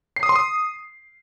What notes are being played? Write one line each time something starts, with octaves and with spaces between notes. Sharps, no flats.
C7
D#6
C6
D#6